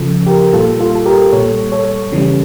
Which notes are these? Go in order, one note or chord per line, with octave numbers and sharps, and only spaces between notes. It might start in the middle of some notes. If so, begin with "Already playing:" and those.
Already playing: C#3 F3 A4
G4 A#4
A#2 G3 F4 A4
F4 A4
A4
G4 A#4
A#2 G3 A4 C#5
A4 C#5
C#3 E3 G3